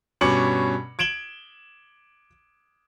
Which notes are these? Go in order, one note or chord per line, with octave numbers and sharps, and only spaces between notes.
G2 B2 C#4 D6 C#7 F#7
G#6 D7 E7 F#7 G7